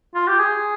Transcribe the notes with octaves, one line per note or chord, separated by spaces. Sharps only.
F4
G4
G#4